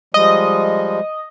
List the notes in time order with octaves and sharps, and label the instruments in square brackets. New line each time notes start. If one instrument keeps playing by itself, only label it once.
[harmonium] F3 G3 G#3 [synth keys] D#5